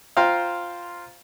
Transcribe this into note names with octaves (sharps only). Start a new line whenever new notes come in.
F4 C5 F5 G5 A#5 F6